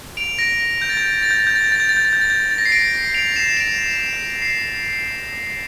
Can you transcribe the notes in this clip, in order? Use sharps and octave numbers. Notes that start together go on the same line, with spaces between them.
D7 F7
A#6 D7
A#6
G6
A6
G6
A6
G6
A6
G6
A6
G6
A6
G6
A6
G6
A6
G6
A6
G6
A6
G6
A6
A#6
C7
A#6 D7
D7 F7
C7 E7
E7
D7 F7
C7